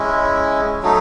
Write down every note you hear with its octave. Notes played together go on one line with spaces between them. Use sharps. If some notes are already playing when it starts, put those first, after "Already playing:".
Already playing: G#3 C#4 E4
F#3 A3 D#4